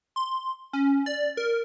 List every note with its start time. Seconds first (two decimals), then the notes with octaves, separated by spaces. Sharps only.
0.16 C6
0.73 C#4
1.06 D5
1.37 A#4